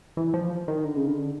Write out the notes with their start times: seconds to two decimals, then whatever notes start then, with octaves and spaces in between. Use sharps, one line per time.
0.17 E3
0.34 F3
0.68 D#3
0.85 D3
0.96 C#3
1.07 D3